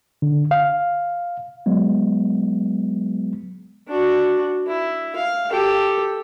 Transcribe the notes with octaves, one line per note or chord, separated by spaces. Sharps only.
D3
F5
F#3 G#3 B3
D4 F#4
E4
F5
G4 A4